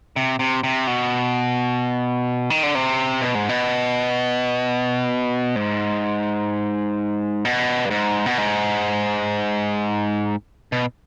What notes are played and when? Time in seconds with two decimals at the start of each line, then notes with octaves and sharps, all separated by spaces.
0.16 C3
0.39 C3
0.64 C3
0.87 B2
2.50 D#3
2.63 D3
2.75 C3
3.21 B2
3.35 G#2
3.49 B2
5.56 G#2
7.45 B2
7.85 G2
7.90 G#2
8.26 B2
8.38 G#2
10.72 B2